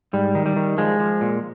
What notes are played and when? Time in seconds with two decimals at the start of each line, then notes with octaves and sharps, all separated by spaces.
0.13 G#2 G3
0.35 D#3
0.46 G3
0.56 D#3
0.78 F3 G#3
1.00 F3
1.21 A#2